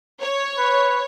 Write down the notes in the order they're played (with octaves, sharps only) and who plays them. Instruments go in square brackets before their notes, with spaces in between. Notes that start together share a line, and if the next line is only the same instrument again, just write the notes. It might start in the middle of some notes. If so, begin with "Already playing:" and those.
[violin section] C#5
[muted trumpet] B4